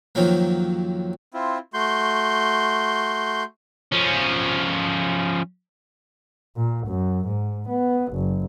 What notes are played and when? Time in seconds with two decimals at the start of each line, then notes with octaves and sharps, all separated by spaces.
0.15 F2 D#3 F3 F#3 A#3
1.34 C4 E4 F4
1.74 A3 F#4 C6 G6
3.92 F3 C#4
6.56 A#2
6.87 F#2
7.26 G#2
7.69 B3
8.13 F#1